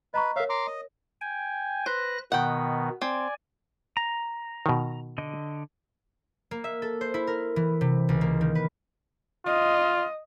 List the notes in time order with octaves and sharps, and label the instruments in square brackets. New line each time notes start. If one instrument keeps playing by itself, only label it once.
[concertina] B4 [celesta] D#5 A#5 C#6
[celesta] A#4 C#5 [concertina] E5 F5
[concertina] A#5 C6 D6
D#5
[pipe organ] G5 G#5
[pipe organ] B4 F#6 A#6 [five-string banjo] C5
[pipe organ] B2 D#3 B3 [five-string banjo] F#5 G5
[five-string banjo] C4 [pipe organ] D5 G#5
[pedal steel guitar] A#5
[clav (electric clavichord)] B2 D#3
[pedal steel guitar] D3 D#5
[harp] A#3
E5
A4
C5
E4
A#4
E3
C3
C#2
A#3
D#3
B4
[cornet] F4 [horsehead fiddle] D#5